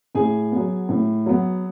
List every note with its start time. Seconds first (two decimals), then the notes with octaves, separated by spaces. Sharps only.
0.15 A2 G#4 G#5
0.52 F#3 B3
0.89 A2
1.26 F#3 B3